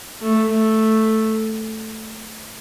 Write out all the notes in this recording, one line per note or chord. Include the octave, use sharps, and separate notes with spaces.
A3
A3